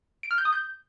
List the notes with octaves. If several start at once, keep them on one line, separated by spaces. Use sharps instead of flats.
D7
F6
G6
D#6
G6